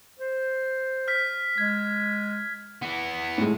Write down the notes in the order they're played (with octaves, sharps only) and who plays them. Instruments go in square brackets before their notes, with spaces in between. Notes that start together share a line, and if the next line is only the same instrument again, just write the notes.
[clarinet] C5
[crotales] F6 B6
[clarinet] G#3 [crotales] G#6
[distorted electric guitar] E3 B3
[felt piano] A2 G#3